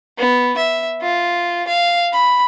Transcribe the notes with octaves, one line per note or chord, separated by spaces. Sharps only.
B3
E5
F4
F5
B5